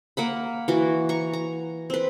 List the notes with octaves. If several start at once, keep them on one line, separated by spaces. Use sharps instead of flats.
A#3 F#5 B5
E3 F#4
A#5 C#6
A#5
C4 B4